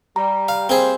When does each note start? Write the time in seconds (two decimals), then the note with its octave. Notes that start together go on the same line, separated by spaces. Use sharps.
0.16 G3 A#5
0.48 F5
0.69 G3 A#3 C4 G#4 C5